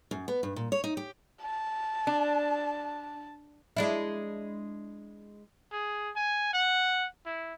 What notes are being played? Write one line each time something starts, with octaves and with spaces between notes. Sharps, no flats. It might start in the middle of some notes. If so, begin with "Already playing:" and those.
F#2
B3
G2
A#2
C#5
D#4
G4
A5
D4
G#3 D4 E4
G#4
G#5
F#5
E4